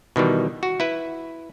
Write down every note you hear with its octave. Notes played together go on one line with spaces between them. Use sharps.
B2 D#3 E3 G3
F#4
E4 B4